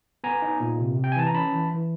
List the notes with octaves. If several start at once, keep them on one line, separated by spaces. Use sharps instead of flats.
B3 G#5 A#5
D#4
A#2
C3
C3
G5
G#5
E3 A5
A#5
C#4 A5 B5
E3
E3